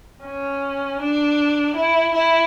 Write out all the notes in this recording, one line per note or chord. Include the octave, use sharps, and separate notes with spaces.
C#4
D4
E4
E4